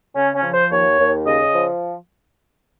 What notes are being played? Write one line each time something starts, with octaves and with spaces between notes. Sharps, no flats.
C#3 C#4
C#4
F3
C5
D#2 C#5
D#2
C#3 D#5
F3